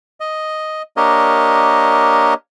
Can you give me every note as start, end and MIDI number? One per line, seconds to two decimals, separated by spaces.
0.20 0.82 75
0.97 2.34 58
0.97 2.34 62
0.97 2.34 67
0.97 2.34 70
0.97 2.34 73
0.97 2.34 75